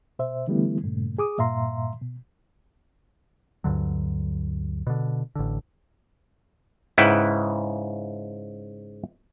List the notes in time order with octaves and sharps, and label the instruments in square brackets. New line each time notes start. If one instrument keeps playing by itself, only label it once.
[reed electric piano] B2 C5 E5
D3 E3 G3 A3 B3 E4
G2 A#2 C#3 A3
G#4 D6 D#6
G2 A#2 E5 F5 A#5 C6
B2
[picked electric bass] D2 G2 D3 F#3
B2 D3
A1 D3
[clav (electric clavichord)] G#2 C#3 E4 B4 F#5 G5